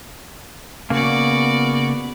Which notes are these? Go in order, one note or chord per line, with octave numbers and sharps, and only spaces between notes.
C#3 A#3 B3 F#4 D5